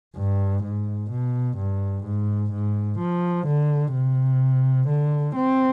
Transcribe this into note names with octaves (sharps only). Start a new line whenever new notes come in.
G2
G#2
B2
G2
G#2
G#2
F3
D3
C3
D3
C4